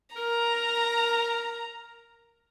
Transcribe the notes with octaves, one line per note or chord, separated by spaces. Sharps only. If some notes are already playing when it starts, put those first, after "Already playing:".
A#4 A#5